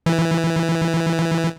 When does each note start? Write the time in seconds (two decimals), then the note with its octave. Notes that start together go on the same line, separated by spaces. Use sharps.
0.06 E3